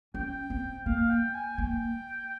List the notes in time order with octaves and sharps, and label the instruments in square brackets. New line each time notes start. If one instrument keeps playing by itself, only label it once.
[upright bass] C#4 [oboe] G5
[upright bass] C4
[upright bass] A#3 [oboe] F5
[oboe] G5
G#5
[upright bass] A#3 [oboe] G5